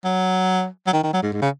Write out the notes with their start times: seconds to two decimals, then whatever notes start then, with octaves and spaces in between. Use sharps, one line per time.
0.04 F#3
0.87 F#3
0.93 D#3
1.03 D#3
1.13 F#3
1.23 G#2
1.33 G#2
1.42 C#3